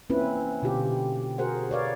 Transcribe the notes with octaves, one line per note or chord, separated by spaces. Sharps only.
A#3 C4 C#4 E4 F4 B4
B2 D3 F4 G4
F#4 G#4 A#4 C5 F#5
B4 C#5 D5 F5